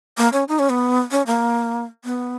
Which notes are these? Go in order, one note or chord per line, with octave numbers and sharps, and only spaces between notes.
A#3
C#4
D#4
C#4
B3
C#4
A#3
B3